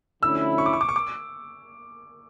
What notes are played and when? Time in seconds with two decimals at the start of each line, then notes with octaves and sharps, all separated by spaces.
0.22 D2 D3 F3 C#4 E4 E6
0.58 C#6
0.66 D6
0.73 C#6
0.81 D6
0.89 C#6
0.96 D6